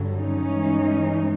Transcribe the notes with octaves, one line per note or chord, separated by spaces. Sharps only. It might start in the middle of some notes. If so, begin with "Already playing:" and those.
Already playing: G2 D3 F#3
C#4 D#4
G2 E3 G#3